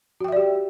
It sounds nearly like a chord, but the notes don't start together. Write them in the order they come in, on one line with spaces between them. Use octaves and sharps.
F#4 G5 E5 D5 G4